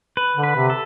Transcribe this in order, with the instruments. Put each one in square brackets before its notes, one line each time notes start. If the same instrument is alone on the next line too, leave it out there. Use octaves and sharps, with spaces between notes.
[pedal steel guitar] B4
[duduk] D3
[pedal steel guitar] B4
[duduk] C3
[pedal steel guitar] A4